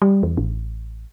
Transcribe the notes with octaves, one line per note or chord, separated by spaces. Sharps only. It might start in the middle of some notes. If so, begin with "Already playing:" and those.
G3
E2
A1